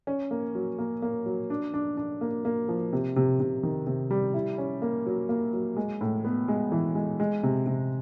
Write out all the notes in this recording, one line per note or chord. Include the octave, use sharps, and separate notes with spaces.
C#4
A#3
F#3
A#3
A#3
F#3
D4
D4
D4
A#3
A#3
F3
C3
C3
C3
D#3
C3
G3
E4
C#4
A#3
F#3
A#3
F#3
G#3
A2
B3
G#3
E3
G#3
G#3
C3
C3